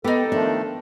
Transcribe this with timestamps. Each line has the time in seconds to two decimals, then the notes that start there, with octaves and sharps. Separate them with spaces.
0.04 B3 D#4 G4 A4
0.32 D#3 F3 A3 D4